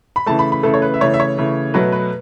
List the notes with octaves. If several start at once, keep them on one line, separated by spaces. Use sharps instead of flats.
B5
C#3 E3 A3 A5
B5
B5
C#3 E3 A3 A4
C#5
B4
E5
C#3 E3 A3 C#5
E5
C#5
C#3 E3 A3
B2 F#3 A3 B4
B4